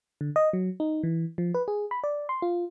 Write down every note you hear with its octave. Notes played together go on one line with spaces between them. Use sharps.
D3
D#5
F#3
D#4
E3
F3
B4
G#4
B5
D5
C6
F4